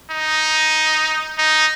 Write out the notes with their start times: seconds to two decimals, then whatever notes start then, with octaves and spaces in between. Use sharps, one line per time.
0.11 D#4
1.38 D#4